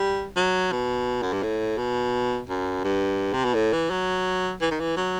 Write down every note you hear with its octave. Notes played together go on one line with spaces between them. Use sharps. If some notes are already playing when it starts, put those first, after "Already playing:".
Already playing: G3
F#3
B2
F#2
G2
A2
B2
F#2
G2
C3
B2
A2
E3
F#3
E3
D#3
E3
F#3